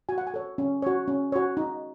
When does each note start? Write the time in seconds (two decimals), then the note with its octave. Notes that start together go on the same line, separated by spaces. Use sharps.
0.09 F#4 G#5
0.18 F#5
0.27 G#5
0.34 A4 C#5
0.58 C#4
0.82 F#4 C#5
1.08 C#4
1.32 F#4 C#5
1.57 D#4